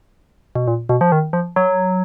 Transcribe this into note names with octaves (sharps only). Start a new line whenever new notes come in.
B2
A#2
B2
F3
D#3
F3
F#3